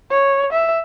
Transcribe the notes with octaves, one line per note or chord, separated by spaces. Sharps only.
C#5
E5